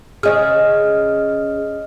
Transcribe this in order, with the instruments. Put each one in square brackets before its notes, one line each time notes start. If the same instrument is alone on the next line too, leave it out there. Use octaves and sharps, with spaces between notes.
[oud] C#3 C#4 G#4 [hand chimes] D#5 F6